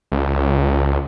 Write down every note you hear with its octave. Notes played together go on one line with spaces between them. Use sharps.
C#2